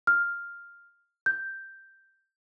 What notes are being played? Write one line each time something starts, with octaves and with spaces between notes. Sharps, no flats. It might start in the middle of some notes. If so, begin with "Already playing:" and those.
F6
G6